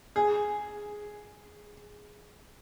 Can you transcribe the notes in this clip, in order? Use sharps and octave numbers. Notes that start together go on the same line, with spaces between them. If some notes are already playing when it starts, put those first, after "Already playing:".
G#4